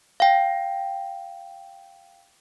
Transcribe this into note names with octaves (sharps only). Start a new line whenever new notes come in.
F5 G5